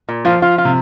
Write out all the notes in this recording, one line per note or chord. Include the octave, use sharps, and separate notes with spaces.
A#2
F3 F4
F4
F4
C3